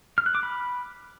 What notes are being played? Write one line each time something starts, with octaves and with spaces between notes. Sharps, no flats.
F6
F#6
D6
B5